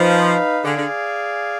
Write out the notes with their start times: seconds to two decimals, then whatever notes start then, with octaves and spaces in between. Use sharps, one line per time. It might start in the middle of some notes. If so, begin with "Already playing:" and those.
Already playing: F3 D#4 B4 F5
0.64 D3 G#4 D5 F5 G#5
0.76 D3